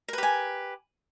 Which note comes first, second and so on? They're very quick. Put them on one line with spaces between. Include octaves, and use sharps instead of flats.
A#4 B4 G4 G#5